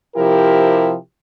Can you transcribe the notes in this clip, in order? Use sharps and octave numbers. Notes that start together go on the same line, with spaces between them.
C3 F3 E4 G4 A#4